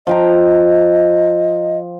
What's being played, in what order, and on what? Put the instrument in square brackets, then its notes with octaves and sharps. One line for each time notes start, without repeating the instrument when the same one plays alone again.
[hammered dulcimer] F3 G5 A#5 [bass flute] D#5